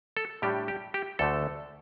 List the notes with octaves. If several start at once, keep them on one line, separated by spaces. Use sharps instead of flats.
A4
A2 G3 D4 G4
G4
G4
D2 D3 A3 A4